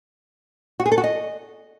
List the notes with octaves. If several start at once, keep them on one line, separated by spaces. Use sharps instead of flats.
F#4
G#4
A4
F#4
D#5